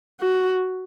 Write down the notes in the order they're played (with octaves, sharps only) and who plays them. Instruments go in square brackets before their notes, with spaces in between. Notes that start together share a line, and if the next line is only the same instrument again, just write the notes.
[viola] F#4